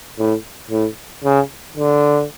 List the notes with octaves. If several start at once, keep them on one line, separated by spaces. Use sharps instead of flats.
A2
A2
C#3
D3